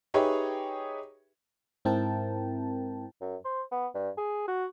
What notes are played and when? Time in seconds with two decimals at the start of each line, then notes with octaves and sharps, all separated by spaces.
0.14 D#4 G4 G#4 B4 C#5 E5
1.85 G#2 C4 E4 A#4 G5 A5
3.21 F#2
3.45 C5
3.72 B3
3.95 G2
4.17 G#4
4.48 F#4